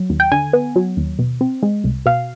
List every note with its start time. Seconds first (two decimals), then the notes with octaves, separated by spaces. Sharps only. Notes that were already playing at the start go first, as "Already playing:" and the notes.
Already playing: F#3
0.10 D#2
0.20 G5
0.32 D3 G#5
0.53 B3
0.76 F#3
0.97 D#2
1.19 B2
1.41 C4
1.63 G#3
1.84 C2
2.06 B2 F5